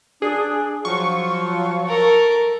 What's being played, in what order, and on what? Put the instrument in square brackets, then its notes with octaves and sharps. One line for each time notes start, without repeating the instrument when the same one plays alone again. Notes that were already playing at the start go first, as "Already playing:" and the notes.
[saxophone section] D4 [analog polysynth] G#4
[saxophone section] F3 F#3 F4 [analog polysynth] C#6
[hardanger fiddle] A4 A#4